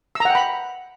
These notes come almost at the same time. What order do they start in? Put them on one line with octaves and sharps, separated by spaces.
E6 A#5 F#5 G5 B5